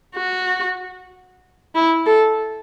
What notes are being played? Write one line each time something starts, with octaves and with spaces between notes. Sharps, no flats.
F#4
E4
A4